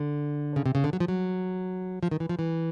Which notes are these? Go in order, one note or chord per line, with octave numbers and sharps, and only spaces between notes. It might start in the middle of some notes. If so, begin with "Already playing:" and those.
Already playing: D3
C#3
C3
C#3
D3
F#3
F3
F#3
F3
D#3
E3
F3
E3